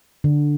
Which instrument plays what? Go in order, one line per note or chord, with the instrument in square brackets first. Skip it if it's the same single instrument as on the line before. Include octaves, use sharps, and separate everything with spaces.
[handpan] D3